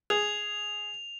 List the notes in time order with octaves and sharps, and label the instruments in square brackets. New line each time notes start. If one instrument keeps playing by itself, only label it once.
[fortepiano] G#4 [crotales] F7